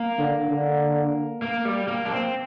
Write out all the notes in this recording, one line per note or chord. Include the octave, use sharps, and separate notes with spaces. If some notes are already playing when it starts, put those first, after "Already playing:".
Already playing: A#3
D3
D3
A#3
G3
A#3
D4
C4